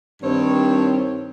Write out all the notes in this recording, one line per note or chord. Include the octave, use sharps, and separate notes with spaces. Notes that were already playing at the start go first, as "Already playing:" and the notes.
G2 D#3 C4 C#5